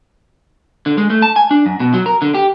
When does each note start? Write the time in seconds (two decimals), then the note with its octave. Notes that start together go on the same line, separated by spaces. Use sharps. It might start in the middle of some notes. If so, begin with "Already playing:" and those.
0.86 D3
0.98 G#3
1.10 A3
1.22 A5
1.36 G#5
1.51 D4
1.66 F#2
1.80 B2
1.94 F#3
2.06 A#4
2.22 D3
2.34 G4